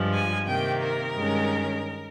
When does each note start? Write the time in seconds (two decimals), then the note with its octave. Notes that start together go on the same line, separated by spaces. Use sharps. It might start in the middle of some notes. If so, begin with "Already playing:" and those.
Already playing: G2 F3 G#3
0.14 G#5
0.48 C3 D#3 A#3 G5
0.81 A#4
1.15 G2 D#3 G#3 C#4